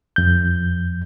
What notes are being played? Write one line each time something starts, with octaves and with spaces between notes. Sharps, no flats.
F2 G6